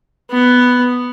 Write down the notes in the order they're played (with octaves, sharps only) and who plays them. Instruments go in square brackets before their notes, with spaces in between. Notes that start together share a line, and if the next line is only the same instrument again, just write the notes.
[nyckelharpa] B3